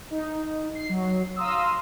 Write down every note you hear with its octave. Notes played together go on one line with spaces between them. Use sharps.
D#4
C7
F#3
F5 A#5 C6 D#6 E6